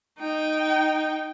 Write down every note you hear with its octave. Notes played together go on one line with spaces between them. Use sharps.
D#4 G5